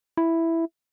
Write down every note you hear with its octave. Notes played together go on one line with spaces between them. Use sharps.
E4